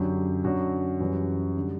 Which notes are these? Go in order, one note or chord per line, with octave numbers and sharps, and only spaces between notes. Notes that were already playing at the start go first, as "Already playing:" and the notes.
Already playing: F#2 D3 F#3 G4
F#2 D3 F#3 F#4
F#2 E3 G3
D3 G3